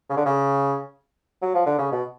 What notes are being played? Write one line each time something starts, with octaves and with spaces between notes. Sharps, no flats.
C#3
D3
C#3
F#3
F3
D3
C#3
B2